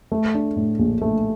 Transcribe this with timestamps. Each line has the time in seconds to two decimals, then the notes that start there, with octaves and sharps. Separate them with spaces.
0.12 A3
0.34 D4
0.56 A2
0.79 A#1
1.02 A3